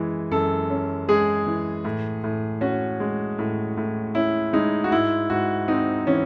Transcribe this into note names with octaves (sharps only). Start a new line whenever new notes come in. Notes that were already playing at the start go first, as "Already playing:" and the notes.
Already playing: F#2 E3 G#3
F#2 A4
C#4
G#3 G#4
E3
A2
A2
C#4 F#4
G#3
A2
A2
C#4 E4
G#3 D#4
F#4
G#2 E4
G#2 F#4
C4 D#4
E3 C#4